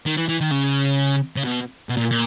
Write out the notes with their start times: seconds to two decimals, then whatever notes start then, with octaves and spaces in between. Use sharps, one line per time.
0.06 D#3
0.17 E3
0.29 E3
0.41 D#3
0.51 C#3
1.36 C#3
1.44 B2
1.89 B2
1.97 A#2
2.11 A#2